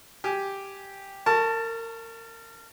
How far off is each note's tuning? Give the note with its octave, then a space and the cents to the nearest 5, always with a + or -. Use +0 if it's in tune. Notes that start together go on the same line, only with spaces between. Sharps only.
G4 +0 G#5 +0
A#4 -30 A5 +10 C#6 +0